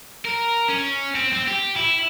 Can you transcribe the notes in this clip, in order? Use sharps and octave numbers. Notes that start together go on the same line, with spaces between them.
A#4
C#4
C4
C4
G4
E4